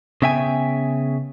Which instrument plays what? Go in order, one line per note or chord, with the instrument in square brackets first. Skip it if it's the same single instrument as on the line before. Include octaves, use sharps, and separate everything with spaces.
[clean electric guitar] C#3 B3 E5 G5 G#5